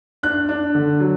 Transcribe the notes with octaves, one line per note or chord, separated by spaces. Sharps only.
D4 F#6
D4
D3
F#3